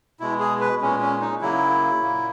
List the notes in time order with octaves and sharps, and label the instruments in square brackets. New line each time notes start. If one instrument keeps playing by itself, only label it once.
[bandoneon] B2 G#3 E4
G#4
B4
A#2 G#3 C#4
C#4
D#4
C#3 F#3 A#3 E4
A#2 A#3